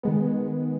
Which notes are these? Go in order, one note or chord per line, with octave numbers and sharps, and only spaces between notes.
D#3 G#3 B3